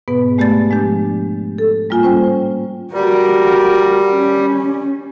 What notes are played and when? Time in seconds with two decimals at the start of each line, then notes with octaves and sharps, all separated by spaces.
0.08 G#2 B2 B3 B4
0.38 G#3 A3 G4 D5 B5 A6
0.70 F3 G#3 D4 G4
1.58 A4
1.89 A2 G3 A#3 F4 G#5 F6
2.03 C#4 C5 G5
2.94 G3 F#4 A#4
4.11 C#4